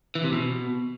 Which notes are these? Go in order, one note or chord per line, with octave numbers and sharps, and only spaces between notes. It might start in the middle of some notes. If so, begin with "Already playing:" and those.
E3
C3
B2